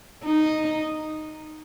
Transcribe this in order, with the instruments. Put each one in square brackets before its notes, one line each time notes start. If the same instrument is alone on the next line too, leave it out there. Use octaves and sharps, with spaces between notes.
[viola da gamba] D#4